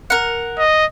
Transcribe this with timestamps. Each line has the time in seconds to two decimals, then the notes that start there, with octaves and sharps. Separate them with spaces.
0.10 A#4 F#5
0.58 D#5